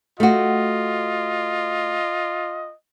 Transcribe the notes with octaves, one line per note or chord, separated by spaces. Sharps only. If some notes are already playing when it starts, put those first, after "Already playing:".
A3 F4 F#4 D#5